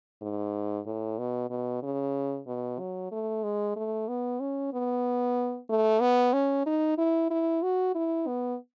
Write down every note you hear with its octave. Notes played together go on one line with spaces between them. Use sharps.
G#2
A2
B2
B2
C#3
B2
F#3
A3
G#3
A3
B3
C#4
B3
A3
B3
C#4
D#4
E4
E4
F#4
E4
B3